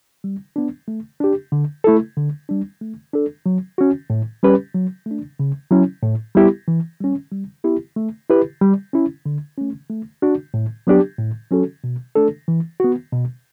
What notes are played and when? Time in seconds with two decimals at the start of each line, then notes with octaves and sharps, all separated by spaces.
0.24 G3
0.56 B3 D4
0.88 A3
1.20 D4 G4
1.52 D3
1.84 A3 E4 A4
2.17 D3
2.49 G3 D4
2.81 A3
3.13 D4 A4
3.46 F#3
3.78 C#4 F#4
4.10 A2
4.43 G3 C#4 G4 B4
4.75 F#3
5.06 A3 D4
5.40 C#3
5.71 F#3 C#4 E4
6.03 A2
6.35 G3 B3 E4 G4
6.68 E3
7.00 G3 C#4
7.32 G3
7.64 B3 E4 G4
7.96 A3
8.29 E4 G4 B4
8.61 G3
8.93 C#4 E4
9.26 D3
9.58 A3 C#4
9.90 A3
10.22 D4 F#4
10.54 A2
10.87 F#3 B3 D4 G4
11.19 A2
11.50 F#3 C#4 F#4 A4
11.84 B2
12.15 A3 D4 A4
12.48 E3
12.80 B3 F#4
13.12 B2